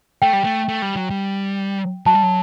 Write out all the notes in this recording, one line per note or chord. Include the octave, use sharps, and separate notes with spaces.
A3 G5
G3
A3
A3
G3
F#3
G3
F#3 A5
G3
F#3